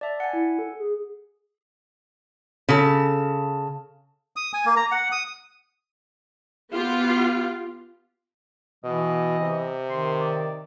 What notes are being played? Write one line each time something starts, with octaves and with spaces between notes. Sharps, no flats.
D5 E5 A5
F#5 G#5
E4
A4
G#4
C#3 A4
D#6
G#5
A#3
A#5
F#5
D#6
B3 F4 G4
B2 E3 D#5
C3
D#3 C6
D5